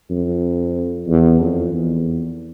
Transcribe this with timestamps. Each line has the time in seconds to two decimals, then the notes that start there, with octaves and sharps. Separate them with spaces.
0.10 F2
1.08 E2
1.41 F2
1.73 E2